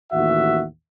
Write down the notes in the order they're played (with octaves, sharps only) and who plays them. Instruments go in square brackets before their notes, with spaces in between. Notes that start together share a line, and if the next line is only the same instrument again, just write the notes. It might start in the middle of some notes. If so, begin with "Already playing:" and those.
[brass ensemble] A1 D#2 F#4 E5 F#5